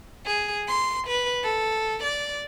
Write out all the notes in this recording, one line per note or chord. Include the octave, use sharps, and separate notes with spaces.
G#4
C6
B4
A4
D5